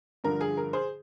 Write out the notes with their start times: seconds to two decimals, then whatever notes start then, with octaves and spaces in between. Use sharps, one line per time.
0.24 G2 D3 F3 A#4
0.41 G#4
0.57 A#4
0.73 G#4 C5